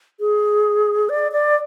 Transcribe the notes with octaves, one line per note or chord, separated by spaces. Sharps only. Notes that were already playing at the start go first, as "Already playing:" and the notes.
G#4
D5
D5